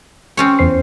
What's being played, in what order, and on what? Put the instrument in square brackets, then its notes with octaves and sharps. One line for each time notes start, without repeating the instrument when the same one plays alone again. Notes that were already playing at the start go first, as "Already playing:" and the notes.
[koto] C4 C#4 C#5
[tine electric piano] E2 C5 C7